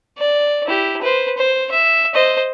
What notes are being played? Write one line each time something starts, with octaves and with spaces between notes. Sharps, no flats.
D5
E4 G4
B4 C5
C5
E5
C5 D#5